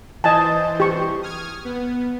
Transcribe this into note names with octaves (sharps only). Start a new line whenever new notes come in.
E3 C5 D#5 G#5 A5
G4 C#6
D#6 F6 G#6
B3